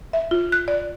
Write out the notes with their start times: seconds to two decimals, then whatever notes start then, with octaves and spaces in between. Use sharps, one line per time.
0.13 E5
0.31 F4
0.52 F#6
0.68 D5